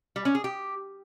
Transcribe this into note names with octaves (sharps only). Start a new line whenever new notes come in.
G3
C#4
G#4
G4